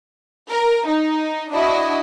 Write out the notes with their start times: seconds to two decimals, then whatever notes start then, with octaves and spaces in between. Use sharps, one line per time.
0.50 A#4
0.88 D#4
1.52 D4 E4 F#4 D#5